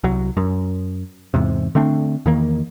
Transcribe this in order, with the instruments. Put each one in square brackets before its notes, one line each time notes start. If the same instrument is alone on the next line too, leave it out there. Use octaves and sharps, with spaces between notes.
[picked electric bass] C2 F#3
F#2
E2 G#2 C3
D3 A3 C4 D4
E2 D#3 A#3